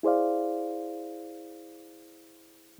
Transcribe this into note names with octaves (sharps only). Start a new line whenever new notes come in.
E4 G#4 C5 D5 F5